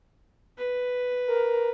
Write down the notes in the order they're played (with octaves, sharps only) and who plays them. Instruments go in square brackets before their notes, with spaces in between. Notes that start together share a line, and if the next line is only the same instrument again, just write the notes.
[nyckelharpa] B4
[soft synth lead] A#4